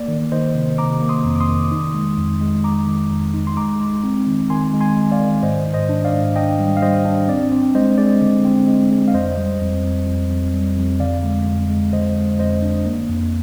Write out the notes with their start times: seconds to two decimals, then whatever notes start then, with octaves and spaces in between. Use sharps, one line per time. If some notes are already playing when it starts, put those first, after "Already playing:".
Already playing: A#3 D5
0.08 D#3
0.32 D#3 C5 D#5
0.55 C3
0.78 C3 A#5 D6
1.02 A#3
1.09 C6 D#6
1.25 F2
1.36 D6
1.40 C6 D#6
1.48 D#3
1.71 D#4
1.94 G#3
2.18 F2
2.41 G#3
2.64 G#3 A#5 D6
2.87 D#3
3.11 F2
3.34 D#4
3.47 C6
3.57 G#3 A#5 D6
3.80 G#3
4.04 C4
4.27 D#3
4.50 D#3 G#5 C6
4.73 G#3
4.81 G#5 C6
4.96 G#3
5.12 D5 F5
5.20 D#3
5.43 G#2 C5 D#5
5.66 G#2
5.74 C5 D#5
5.89 D4
6.05 D5 F5
6.12 G#2
6.36 D4 D#5 G5
6.59 G3
6.77 F5
6.82 G3 C5 D#5
7.05 D4
7.28 C4 D5
7.52 C4
7.75 G#3 C5 D#5
7.98 G#3 D5
8.21 D3
8.44 C4
8.68 G#3
8.91 G#3
9.08 F5
9.14 F2 C5 D#5
9.37 G3
9.61 F2
9.84 F2
10.07 F2
10.30 F2
10.54 G3
10.77 F2
11.00 D3 D5 F5
11.24 G#3
11.46 F2
11.70 G#3
11.93 D3 C5 D#5
12.16 G#3
12.39 F2 C5 D#5
12.63 D4
12.86 A#3
13.09 F2